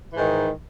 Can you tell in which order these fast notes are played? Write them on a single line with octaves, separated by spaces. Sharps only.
E3 G#2 D#3